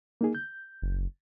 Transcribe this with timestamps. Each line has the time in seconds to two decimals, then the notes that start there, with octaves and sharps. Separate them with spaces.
0.21 A#3 D#4 G#4
0.35 G6
0.82 F#1